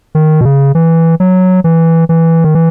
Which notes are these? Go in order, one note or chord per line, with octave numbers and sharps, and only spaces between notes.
D#3
B2
C#3
E3
F#3
E3
E3
D#3
E3